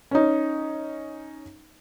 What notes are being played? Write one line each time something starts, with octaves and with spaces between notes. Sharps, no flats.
C#4 D#4